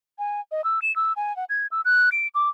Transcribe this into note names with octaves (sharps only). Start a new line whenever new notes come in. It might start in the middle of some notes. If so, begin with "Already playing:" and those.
G#5
D#5
E6
E7
E6
G#5
F#5
G#6
E6
F#6
D7
D6